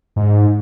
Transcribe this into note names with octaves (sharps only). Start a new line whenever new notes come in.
G#2